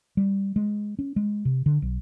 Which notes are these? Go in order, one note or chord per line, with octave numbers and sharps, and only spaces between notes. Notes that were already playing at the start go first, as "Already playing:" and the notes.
G3
G#3
C#4
G#3
C3
D3
B1